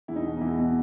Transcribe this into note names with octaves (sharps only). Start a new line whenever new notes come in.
E2 E4
D#4
B2
D#4
E2 E4
B2